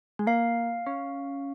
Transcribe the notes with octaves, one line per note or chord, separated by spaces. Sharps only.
G#3
A#3 F5
C#4